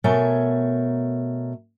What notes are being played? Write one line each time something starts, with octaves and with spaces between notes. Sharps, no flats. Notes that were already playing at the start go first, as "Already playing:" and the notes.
B2 A3 A#4 C#5 G#5 A#5